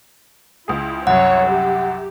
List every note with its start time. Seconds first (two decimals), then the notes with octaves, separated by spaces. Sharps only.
0.68 C#2 E4 G#4
1.07 C2 F#2 C#5 F#5
1.48 G4